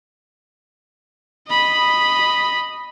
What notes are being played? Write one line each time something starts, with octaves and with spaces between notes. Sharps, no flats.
D#5 B5